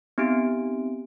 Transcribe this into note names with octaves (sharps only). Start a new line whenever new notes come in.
B3 C4 D#4 G4 D7